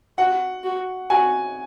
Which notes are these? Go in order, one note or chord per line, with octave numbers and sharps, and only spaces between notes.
F#4 F#5
F#4
F#4 G#5